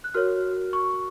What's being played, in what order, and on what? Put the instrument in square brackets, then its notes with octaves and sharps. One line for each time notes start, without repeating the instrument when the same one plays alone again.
[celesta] F#6
F#4 A#4 C#5 F6
C#6